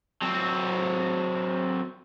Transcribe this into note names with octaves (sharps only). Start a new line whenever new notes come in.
F#3 C4